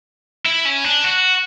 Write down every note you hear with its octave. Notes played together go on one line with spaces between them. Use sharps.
E4
C#4
D4
F#4